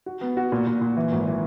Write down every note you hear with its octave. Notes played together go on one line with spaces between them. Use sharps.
F#4
B3
F#4
A#2
A#2
A#2
E3
G#1
E3